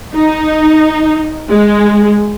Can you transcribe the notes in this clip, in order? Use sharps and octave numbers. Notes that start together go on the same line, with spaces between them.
D#4
G#3